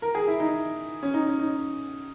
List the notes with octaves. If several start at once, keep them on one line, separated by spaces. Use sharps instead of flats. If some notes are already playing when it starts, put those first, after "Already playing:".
A#4
G#4
E4
D#4
C#4
D#4
C#4
D#4